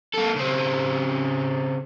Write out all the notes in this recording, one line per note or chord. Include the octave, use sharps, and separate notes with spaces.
A#3 A4
C#3 C4